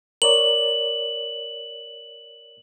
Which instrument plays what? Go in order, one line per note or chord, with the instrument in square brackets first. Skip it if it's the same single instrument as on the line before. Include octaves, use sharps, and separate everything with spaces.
[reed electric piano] A#4 C#5 D5 [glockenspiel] F#7